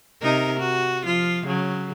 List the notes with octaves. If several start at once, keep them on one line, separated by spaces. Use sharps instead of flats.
C3 D#4 A#4
F#4
F3 F4
C#3 F#3